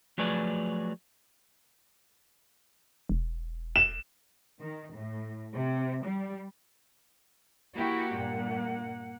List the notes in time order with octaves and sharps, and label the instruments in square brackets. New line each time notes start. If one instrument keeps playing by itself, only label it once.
[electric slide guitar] F3 F#3 A3 G#4 B4 D5
[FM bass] E1
[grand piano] E7
[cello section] D#3
A2
C3
G3
[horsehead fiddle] A#3 F#5 [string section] E4 F#4 G4
[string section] G2 A#2